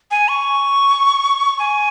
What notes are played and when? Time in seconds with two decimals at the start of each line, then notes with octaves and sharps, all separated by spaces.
0.11 G#5
0.28 C#6
1.59 G#5